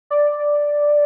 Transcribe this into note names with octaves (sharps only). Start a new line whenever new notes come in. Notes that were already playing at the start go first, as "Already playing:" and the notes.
D5